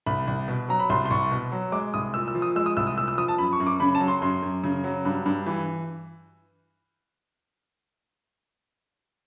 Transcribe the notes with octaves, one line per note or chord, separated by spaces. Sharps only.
C2 B5
C2
B2
F#3 A#5
B5
C2 C6
C6
C2 C#6
B2
F#3
G#3 D6
C2 D#6
A#2 E6
E6
F3
D#6
G#3 E6
D#6
C2 E6
D#6
A#2 E6
E6
F3 D#6
A5
F#2 B5
C#6
F#2
D6
C#3 B5
A5
F#3
C6
F#2 C6
F#2
C#3
F#3
G2
G2
E3